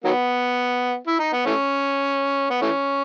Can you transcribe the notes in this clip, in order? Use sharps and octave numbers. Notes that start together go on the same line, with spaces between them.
D#3 F#3 B3
E4
D#4
B3
E3 A3 C#4
B3
E3 A3 C#4